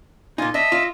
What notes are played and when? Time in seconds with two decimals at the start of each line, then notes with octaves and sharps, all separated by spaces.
0.38 A#2 D#4 F4 G#5
0.54 D4 D#5 E5 E6
0.72 F4